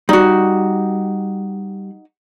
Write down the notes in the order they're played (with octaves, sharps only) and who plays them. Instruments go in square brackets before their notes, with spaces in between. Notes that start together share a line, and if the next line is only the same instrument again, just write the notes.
[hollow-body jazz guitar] G3 [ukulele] D#4 F#4